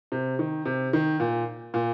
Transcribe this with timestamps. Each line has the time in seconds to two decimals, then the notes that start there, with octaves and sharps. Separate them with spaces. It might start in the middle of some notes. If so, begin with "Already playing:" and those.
0.12 C3
0.39 D#3
0.65 C3
0.93 D#3
1.20 A#2
1.74 A#2